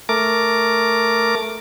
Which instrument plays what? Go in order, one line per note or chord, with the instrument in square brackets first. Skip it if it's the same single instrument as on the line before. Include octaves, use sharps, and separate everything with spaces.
[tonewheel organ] A3 A#4 D6